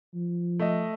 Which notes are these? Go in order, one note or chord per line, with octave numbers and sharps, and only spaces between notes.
F3
A3 D#5